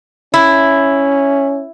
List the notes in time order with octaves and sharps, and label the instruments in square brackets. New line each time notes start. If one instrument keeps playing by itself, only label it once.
[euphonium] C#4 [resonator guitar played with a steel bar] E4